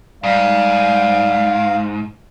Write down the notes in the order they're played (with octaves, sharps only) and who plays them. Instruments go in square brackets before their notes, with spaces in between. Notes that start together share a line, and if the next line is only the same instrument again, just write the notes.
[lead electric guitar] G#2 [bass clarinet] G3 [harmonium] F5